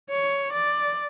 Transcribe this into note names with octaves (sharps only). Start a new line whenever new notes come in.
C#5
D5